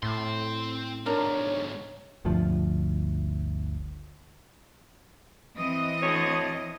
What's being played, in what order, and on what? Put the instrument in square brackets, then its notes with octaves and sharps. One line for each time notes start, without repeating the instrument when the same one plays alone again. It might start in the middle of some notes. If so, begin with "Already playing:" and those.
[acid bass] A2 [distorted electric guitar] C4 C6
[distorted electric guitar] B1 G#2 [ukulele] D4 A#4 [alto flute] C#5
[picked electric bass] G1 D2 F3
[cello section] E3 C4 D#5
[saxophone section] D2 C#5